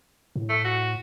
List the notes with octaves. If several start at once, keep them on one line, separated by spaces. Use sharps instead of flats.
A2
A3
F#4